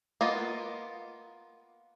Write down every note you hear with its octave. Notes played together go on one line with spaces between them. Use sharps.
A#3 B3 F4 D#5